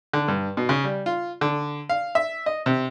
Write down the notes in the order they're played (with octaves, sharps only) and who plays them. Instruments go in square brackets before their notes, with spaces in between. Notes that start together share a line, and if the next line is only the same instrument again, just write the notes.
[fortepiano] D3
G2
B2
C#3
G3
F4
D3
F5
E5
D#5
C3